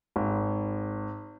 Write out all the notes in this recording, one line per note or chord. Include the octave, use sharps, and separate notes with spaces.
G#1